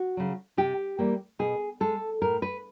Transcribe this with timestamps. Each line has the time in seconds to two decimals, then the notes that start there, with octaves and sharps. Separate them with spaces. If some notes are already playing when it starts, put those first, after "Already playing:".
Already playing: F#4
0.17 C#3 F#3
0.57 C3 G4
0.99 E3 G3 A#3
1.39 B2 G#4
1.80 G#3 A4
2.22 A2 A#4
2.42 B4